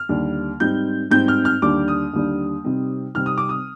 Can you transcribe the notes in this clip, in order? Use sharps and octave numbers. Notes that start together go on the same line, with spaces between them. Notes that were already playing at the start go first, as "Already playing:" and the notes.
Already playing: F6
D#2 D3 G3 D4
G#2 G3 C4 D#4 G6
G#2 G3 C4 D#4 G6
F6
F6
D#2 D3 G3 D4 D6
D#6
D#2 D3 G3 D4
C3 G3 C4 D#4
C3 G3 C4 D#4 F6
D#6
D6
D#6